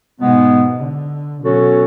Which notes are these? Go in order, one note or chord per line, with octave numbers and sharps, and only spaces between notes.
G#2 B2 G#3 B3
D3
B2 F#3 C#4 F#4 A4